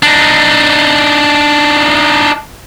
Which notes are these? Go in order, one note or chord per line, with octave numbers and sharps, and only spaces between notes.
D4 D#4